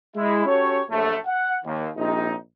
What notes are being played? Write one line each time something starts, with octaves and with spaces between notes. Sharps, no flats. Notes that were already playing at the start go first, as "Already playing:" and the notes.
G#3 E4
C#4 F#4 G4 A4 C#5
A#1 F#2 A3
F#5
D#2
A#1 C3 D#4